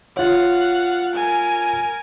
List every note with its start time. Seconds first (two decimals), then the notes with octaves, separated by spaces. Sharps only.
0.17 F4 C#5 F5 F#5
1.15 A#4 G#5